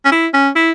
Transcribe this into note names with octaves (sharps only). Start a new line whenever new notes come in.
C#4
E4
C#4
E4